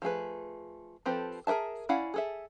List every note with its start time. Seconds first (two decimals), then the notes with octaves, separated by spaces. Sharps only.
0.02 F3 A3 G#4 B4
1.06 F3 C4 G4 A4 B4
1.47 G#4 A#4 C5 E5 A5
1.89 C#4 E4 D5 F5 F#5
2.14 G#4 A4 E5